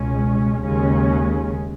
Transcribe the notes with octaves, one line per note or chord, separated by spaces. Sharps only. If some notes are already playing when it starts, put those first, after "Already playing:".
Already playing: C#2 B2 G#3 C#4
D#2 C#3 G#3 C#4